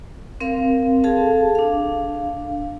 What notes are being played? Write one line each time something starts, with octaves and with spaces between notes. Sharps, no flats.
C4 A#4 F5
G#4 A4 F5 A5
D4 F5